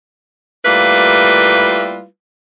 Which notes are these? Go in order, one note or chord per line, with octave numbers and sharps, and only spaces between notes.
G3 A3 A#3 E4 F4 B4